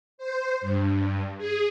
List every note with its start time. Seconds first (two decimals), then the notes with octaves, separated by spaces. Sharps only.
0.18 C5
0.61 G2
1.38 G#4